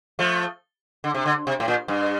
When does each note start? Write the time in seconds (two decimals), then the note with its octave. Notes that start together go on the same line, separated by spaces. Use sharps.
0.19 F3 A3
1.04 D3
1.15 C3
1.26 D3
1.47 C3
1.60 A2
1.68 A#2
1.88 G2